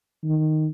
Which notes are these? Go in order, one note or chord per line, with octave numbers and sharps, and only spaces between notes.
D#3